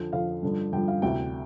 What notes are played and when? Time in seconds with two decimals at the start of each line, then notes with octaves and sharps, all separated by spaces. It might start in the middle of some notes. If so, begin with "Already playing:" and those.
Already playing: F2 D3 F3
0.13 F2 D3 F3 F5
0.43 G2 D3 F3
0.73 G2 D3 F3 G5
0.88 F5
1.02 D2 C3 E3 G5